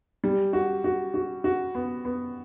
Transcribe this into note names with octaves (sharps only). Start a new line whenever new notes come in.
G3
F#4
F#4
F#4
F#4
B3
B3